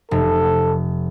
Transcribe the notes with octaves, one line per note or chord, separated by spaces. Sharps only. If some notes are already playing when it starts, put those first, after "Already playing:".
F1 A4